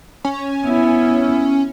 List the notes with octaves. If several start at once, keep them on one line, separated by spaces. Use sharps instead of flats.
C#4
B3 E4